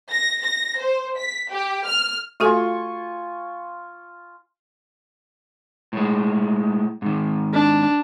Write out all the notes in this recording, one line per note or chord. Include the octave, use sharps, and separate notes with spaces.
A#6
A#6
C5
B6
G4
F6
A3 F4 F#4 A4 G#5 C#6
A2 G#3
G#2 D#3
D4